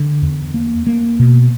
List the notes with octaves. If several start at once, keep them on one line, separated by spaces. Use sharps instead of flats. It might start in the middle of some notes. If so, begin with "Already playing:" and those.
Already playing: D3
E2
A#3
A#3
B2